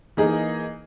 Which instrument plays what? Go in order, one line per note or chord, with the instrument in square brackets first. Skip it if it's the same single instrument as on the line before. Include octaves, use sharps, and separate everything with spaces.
[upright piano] E3 A#3 D#4 G#4 D#5